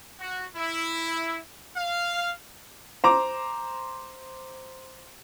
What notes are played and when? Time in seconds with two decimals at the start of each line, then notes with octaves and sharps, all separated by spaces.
0.20 F#4
0.56 E4
1.76 F5
3.04 C5 A#5 D6